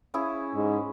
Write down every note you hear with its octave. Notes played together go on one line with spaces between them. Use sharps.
C#4 E4 G#4
G#2